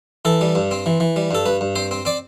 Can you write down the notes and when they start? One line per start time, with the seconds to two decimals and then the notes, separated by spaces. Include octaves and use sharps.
0.25 E3 A4
0.41 G3
0.55 G2
0.71 C4
0.86 E3
1.00 E3
1.16 G3
1.31 G2 A4
1.46 G2 B4
1.61 G2
1.76 C4 C5
1.91 C4
2.05 C4 D5